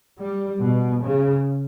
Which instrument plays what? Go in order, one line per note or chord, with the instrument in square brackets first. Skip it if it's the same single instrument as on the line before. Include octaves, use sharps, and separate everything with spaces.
[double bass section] G3
B2
C#3